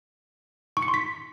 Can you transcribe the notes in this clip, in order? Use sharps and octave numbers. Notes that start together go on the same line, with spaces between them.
C#6
C#7
C6
B6